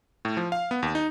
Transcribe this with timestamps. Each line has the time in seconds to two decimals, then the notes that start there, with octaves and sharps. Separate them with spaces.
0.25 A2
0.37 F3
0.52 F5
0.71 B3
0.83 D#2
0.95 D#4